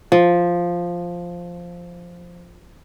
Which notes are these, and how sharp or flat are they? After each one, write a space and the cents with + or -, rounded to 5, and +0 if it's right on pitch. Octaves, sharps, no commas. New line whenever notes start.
F3 +0